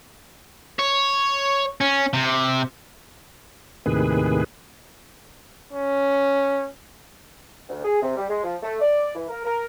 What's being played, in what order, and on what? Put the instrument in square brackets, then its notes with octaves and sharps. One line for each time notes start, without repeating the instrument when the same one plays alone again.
[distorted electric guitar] C#5
C#4
C3
[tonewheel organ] D#2 A2 C3 D#3 G#4 B4
[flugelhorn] C#4
[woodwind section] D2
G#4
C3
G3
G#3
F3
A3
D5
E3
A#4
A#4